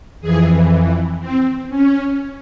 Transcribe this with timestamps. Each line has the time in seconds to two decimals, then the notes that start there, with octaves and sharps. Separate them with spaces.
0.21 F2 E3 G#4
1.20 C4
1.69 C#4